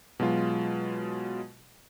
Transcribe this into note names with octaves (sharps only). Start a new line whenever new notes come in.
B2 F#3 G#3 F4